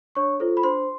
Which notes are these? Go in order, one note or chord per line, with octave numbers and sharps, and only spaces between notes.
D4 C#5 C#6
F4 A4 C5
B5
D4 C5 C6